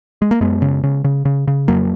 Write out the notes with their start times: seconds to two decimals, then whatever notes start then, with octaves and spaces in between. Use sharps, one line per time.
0.22 G#3
0.31 A#3
0.41 F#2 G#3 B3
0.62 C#3
0.83 C#3
1.04 C#3
1.25 C#3
1.47 C#3
1.68 F2 F#3 A#3